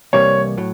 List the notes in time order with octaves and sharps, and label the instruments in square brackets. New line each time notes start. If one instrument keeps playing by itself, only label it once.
[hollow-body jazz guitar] C2 C3 E3 G3 A#3 [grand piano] C#5
[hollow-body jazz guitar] A2 F#3